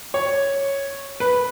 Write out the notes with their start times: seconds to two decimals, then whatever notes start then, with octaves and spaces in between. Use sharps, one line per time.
0.14 C#5
1.20 B4